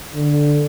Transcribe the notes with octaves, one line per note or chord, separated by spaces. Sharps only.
D3